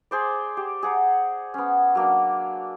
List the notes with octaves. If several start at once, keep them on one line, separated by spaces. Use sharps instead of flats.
G#4 C5 D5
G4
G#4 F#5 A#5
B3 C#4
F#3 A#3 D4